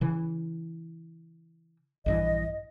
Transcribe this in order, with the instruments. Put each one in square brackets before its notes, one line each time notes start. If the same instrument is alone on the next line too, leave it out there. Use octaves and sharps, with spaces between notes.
[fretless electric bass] C#3 E3
[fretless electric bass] A#1 G2 E3 [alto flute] D#5